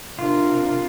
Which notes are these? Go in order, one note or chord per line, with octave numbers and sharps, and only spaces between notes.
C3 D4 F4 A#4